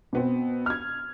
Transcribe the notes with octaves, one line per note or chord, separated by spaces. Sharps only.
B2 B3 C4
F6 G#6